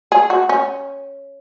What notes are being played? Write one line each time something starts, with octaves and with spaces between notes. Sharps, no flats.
G#4
F#4
C#4